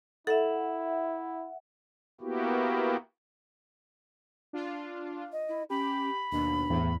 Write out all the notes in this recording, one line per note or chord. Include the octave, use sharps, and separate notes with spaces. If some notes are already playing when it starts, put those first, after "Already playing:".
E4 A4 E5 F#5
A#3 B3 E4 F#4 G4
D4 F4
D#5
E4
C#4 G4 B5
D#2 B2 D4
E2 A2